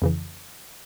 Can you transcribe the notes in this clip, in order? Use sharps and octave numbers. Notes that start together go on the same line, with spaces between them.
F2 C#3 E3